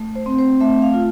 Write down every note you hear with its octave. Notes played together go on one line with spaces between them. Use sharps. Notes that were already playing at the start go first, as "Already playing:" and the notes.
Already playing: A3
C5
C4
C5
A3 E5
F5
F4